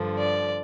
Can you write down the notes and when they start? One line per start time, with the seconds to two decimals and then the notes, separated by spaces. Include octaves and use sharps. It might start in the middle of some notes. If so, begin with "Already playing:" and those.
Already playing: G2 D3 F3
0.18 D5